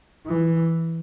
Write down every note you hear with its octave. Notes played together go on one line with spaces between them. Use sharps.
E3